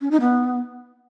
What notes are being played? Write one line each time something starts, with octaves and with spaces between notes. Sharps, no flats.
C#4
D#4
B3